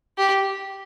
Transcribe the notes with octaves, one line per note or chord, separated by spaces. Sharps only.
G4